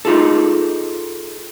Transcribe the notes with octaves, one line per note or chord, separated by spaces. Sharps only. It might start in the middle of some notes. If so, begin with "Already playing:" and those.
D#4 F4 G#4 A4